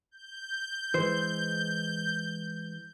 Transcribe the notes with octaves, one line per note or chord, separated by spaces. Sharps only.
G6
E3 G#3 C5